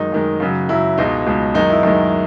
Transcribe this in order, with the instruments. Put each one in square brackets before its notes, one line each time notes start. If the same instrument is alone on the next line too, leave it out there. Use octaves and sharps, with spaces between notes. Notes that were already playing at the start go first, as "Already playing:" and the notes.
Already playing: [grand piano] F#2 D#3 G#3 D#4
F#2 D#3 G#3
F#2 C#3 F#3
F#2 C#3 F#3 E4
C#2 B2 G#3 D#4
C#2 B2 G#3
F#2 D#3 G#3 D#4
E4
F#2 D#3 G#3